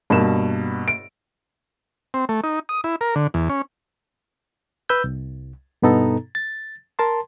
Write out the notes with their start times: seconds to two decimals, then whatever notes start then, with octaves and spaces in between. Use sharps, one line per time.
0.10 G2 B2 A#3 E7
0.88 D7
2.14 C4
2.29 A3
2.44 D#4
2.69 D#6
2.84 E4
3.01 A#4
3.16 D3
3.34 E2
3.50 C#4
4.89 B4 E6 G6
5.04 C2
5.82 G2 B2 B3 D#4 A4 A#5
6.35 A6
6.99 A#4 A5 C6